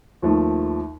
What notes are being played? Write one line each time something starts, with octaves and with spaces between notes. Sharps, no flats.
D#2 F3 A3